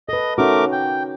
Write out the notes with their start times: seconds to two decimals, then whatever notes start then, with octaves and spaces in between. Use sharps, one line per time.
0.09 A4 B4 D#5
0.38 A3 C#4 D#4 F#4 A#4 D6
0.72 G5